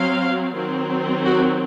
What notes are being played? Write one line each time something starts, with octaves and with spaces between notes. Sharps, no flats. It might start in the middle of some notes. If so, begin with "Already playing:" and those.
Already playing: F#3 C4 F5
D#3 F#3 C4
F#4